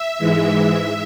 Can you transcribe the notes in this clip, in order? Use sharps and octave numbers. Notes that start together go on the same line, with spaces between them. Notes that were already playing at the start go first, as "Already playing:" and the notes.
Already playing: E5
G#2 E3 G#3